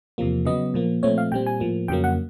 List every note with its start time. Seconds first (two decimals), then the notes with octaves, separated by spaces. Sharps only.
0.18 E2 C3 F3 A#3
0.45 C#3 F#3 B3 D#5
0.74 A#2 F3 A#3
1.03 A#2 F3 A3 C4 C#5
1.18 F5
1.32 A#2 G3 C4 G5
1.46 G#5
1.60 A2 F3 A#3
1.88 F2 C#3 F#3 A#3 G5
2.04 F#5